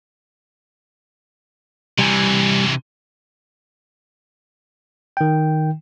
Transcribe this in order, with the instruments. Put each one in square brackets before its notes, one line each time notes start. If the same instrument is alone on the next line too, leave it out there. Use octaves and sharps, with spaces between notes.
[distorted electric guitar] C3 E3 [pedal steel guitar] G3 G#5
[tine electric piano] D#3 G5